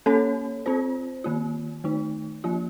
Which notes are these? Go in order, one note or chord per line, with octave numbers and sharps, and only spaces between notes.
A#3 C#4 A4 C#5
C4 F4 C5
D#3 A#3 F4
D#3 A3 D#4
F3 A#3 F4